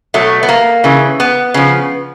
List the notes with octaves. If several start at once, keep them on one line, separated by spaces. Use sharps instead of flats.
B2 F#3 A3
B3
A#3
C#3 E3
B3
C#3 F3